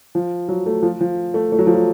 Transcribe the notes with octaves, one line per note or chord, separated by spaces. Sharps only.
F3
F#3
A3
F3
F3
A3
A3
F#3
F3
F#3